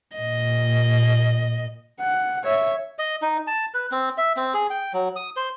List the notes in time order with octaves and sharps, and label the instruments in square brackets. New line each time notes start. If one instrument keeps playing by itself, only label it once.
[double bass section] A#2 [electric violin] D#5
[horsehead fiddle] F#5
C#5 E5
[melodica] D#5
D#4
A5
B4
C4
E5
C4
G#4
G5
F#3
D#6
C5